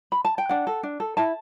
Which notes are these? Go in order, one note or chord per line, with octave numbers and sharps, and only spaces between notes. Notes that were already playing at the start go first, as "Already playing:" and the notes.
B5
A5
G5
D4 F#5
A4
D4
A4
E4 A5